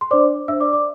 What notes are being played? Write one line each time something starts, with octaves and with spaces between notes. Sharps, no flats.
C6
D4 C5 D5 D6
D4 C5 E5 E6
D5 D6
D5 D6